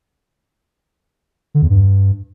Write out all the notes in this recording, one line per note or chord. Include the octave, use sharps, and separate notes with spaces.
D3
E2
G2